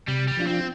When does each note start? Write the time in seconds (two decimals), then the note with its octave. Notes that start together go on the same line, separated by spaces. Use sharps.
0.08 C3 G3
0.28 G3
0.37 F3 D4 F4
0.47 C4